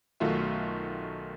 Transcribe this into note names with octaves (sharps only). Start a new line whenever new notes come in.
B1 D#3 A3 F4 F#4 E5